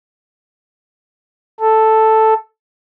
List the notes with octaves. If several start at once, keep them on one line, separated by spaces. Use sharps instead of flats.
A4